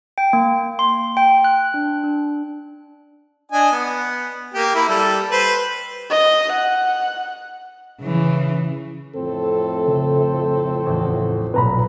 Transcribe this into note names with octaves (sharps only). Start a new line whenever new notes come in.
G5
A#3
C6
G5
F#6
D4
D4
D4 D#5 G#5
B3
A#3 G4
A#3 E4 B5
G3 A4
B4 C5
D#5
F#5
C#3 E3
F2 A2 C4 A4
C#3
A1 E2
B1 A#2 B4 A#5 B5